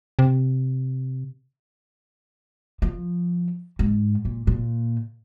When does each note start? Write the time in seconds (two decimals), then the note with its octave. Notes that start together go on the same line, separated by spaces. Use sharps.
0.19 C3
2.82 F3
3.79 G#2
4.25 A#2
4.47 A#2